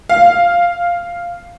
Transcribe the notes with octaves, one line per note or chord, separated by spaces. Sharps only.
F5